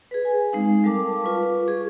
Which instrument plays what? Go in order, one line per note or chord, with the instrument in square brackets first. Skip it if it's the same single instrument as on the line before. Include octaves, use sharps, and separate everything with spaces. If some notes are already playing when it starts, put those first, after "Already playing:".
[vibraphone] G#4 B4
G#5
G#3 C4 D#4 F5
G3 A4 A#4 F5 A5 D6
F4 B4 C#6
G#4 C#6